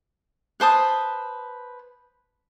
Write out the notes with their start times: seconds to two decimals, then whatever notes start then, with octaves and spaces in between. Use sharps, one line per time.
0.60 B4 C5 A5 D#6